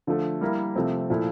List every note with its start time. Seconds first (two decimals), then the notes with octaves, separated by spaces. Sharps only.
0.07 D3 F3 A3
0.41 G3 A#3 E4 A#4
0.76 C3 F3 A3 C4
1.10 A#2 F3 A3 E4